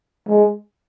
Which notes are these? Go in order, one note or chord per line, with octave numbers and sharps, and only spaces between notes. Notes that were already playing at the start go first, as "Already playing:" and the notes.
G#3